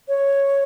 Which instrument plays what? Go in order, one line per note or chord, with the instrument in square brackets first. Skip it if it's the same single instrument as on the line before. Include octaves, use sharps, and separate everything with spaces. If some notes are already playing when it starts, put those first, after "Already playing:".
[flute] C#5